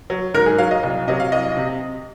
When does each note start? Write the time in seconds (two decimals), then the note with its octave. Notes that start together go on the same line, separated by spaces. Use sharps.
0.10 F#3
0.34 G#2 A#4
0.46 G#4
0.58 F#3 F5
0.71 D#5
0.83 C2
1.08 C3 F#3 D#5
1.20 F5
1.32 C2 D#5
1.57 C3